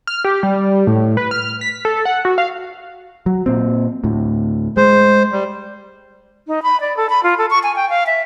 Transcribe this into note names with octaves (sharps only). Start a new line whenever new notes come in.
F6
G4
G3
A2
B4
F6
B6
A4
F#5
F#4
F5
F#3
A#2 C4
D2 A2
G#3 C5
G3
D#4
B5
D5
A4
B5
F4
A4
C#6
G#5
G5
F5
E5